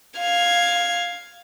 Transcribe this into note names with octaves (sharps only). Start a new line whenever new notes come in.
F5 G#6